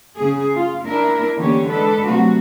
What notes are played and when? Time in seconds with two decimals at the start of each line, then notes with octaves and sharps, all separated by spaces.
0.17 C#3 G#4
0.54 F4
0.85 D4 E4 A#4
1.37 D3 E3 A#3 C#4 G4 C#5
1.68 G#3 D4 A4 B4
2.07 C3 F#3 A3 F#4